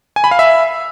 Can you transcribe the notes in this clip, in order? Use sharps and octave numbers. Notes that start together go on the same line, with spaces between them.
G#5
B5
F5
E5